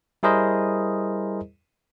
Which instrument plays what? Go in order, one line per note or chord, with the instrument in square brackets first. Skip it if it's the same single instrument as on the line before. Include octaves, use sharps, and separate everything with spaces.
[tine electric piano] G3 E4 G#4 A#4 C5 D#5